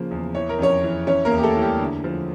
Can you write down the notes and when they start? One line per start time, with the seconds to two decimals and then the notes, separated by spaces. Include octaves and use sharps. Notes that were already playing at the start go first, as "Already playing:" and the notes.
Already playing: C#3 F3 A#3
0.11 E2
0.35 E3 C#5
0.49 A#4
0.59 F2 C#4 C#5
0.84 E3
1.07 E3 C#4 C#5
1.25 A#3 A#4
1.32 E2
1.38 G4
1.43 A3 A4
1.56 E3
1.62 G3 G4
1.79 D3
2.04 F3